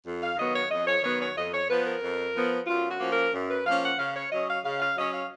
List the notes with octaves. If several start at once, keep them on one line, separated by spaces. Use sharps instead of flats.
F2
F5
D#3 F#3 B3 D#5
C#5
F2 D#5
C#5
D#3 F#3 B3 C#5
C#5
F2 D#5
C#5
F3 B3 B4
A#4
F2
F3 B3
F#2 F4
F#4
F3 A#3 C#4
A#4
F#2
B4
F3 A#3 C#4 F5
F#5
C#3 F5
C#5
F#3 C#4 D#5
F5
C#3 F5
F5
F#3 C#4 D#5
F5